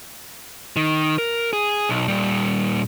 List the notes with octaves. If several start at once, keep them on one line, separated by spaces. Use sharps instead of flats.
D#3
A#4
G#4
B1
A#2 G3